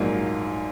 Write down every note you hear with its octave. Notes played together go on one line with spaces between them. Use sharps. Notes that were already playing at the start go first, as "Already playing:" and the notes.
Already playing: A#1 G#2 F#3 A#3 D#4 F5